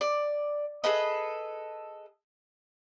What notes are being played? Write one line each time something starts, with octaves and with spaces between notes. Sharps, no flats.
D5
G#4 A4 B4 D#5